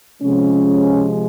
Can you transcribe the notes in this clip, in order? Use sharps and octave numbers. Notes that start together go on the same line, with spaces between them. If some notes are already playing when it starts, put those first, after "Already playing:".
C3 F3 G#3 C#4